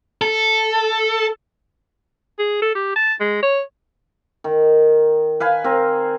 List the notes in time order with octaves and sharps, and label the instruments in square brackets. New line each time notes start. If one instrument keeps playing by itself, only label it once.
[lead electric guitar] A4
[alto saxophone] G#4
A4
G4
A5
G#3
C#5
[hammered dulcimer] D#3
B4 F5 G#5
C4 A#4